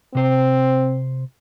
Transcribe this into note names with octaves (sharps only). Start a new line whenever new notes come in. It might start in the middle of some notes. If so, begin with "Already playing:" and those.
C3 C4 C5